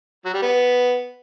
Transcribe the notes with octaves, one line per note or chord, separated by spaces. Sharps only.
F#3
G3
B3